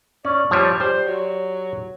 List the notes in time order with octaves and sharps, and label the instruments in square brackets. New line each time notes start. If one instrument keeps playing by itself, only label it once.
[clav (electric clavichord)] C#4 [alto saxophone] D5
[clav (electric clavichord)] F3 G3 [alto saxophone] C#5
[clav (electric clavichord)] G4 D5 [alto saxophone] C5
[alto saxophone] F#3